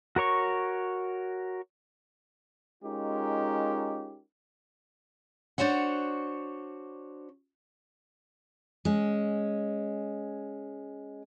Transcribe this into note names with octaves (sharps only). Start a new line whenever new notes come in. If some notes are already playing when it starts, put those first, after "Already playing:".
F#4 A#4 C#5 C#6
G#3 C#4 D#4 F4 G4 A#4
D4 F#4 C5 C#5 F#5
G#3 C#4